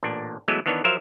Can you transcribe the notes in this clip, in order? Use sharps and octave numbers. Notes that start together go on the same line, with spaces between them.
A1 A#2 D4
E3 F#3 G#3 A3 B3
D#3 E3 B3 D4 C#5
F3 F#3 A#4 C5 E5 F5